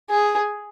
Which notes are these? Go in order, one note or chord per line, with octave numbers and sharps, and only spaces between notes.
G#4